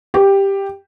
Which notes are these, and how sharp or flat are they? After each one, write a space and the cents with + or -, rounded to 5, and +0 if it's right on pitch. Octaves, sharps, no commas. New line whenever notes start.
G4 +5